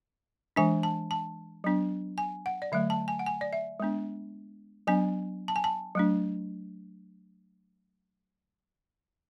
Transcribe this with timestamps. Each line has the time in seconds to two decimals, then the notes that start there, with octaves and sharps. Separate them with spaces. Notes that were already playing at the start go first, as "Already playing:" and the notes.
0.56 E3 G#3 D4 G#5
0.83 A5
1.11 A5
1.64 F#3 B3 D4
2.18 G#5
2.46 F#5
2.62 D5
2.72 D3 F#3 A3 E5
2.90 A5
3.08 G#5
3.19 F#5
3.26 G#5
3.41 D5
3.53 E5
3.80 G#3 B3 D4
4.87 F#3 B3 D4 G#5
5.48 A5
5.56 G#5
5.64 A5
5.95 F#3 A3 D4